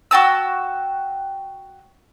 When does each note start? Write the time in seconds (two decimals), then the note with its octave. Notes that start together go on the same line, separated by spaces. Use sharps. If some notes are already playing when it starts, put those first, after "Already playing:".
0.11 F#4 G5 A5 E6